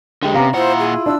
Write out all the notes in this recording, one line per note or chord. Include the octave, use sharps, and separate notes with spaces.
D3 G#3 G4 G5
C3 B3 C#4 G4 F5 A#5
A#2 E4 F4 C5 F#5
G#4
D4 E6